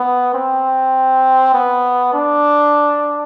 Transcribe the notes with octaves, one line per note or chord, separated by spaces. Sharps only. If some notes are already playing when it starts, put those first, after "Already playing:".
Already playing: B3
C4
B3
D4